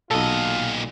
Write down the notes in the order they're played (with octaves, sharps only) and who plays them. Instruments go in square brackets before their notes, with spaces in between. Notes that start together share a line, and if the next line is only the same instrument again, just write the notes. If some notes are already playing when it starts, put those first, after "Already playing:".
[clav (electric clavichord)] B1 A4 [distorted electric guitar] A#2 D#5 [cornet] F4